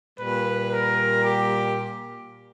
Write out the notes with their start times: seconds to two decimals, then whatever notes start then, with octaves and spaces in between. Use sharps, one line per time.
0.17 A#2 G3 B4
0.69 A#4
1.22 G4